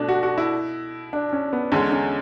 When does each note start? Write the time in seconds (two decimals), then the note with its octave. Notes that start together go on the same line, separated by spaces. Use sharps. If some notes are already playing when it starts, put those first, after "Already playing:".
Already playing: B2 A3 D4
0.09 F#4
0.23 F#4
0.38 E4
1.13 D4
1.33 C#4
1.53 B3
1.72 E2 D3 G#3 C#4
1.92 C#4